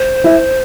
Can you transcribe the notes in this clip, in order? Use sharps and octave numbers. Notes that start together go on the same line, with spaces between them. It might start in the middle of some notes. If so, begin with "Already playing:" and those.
Already playing: C5
E4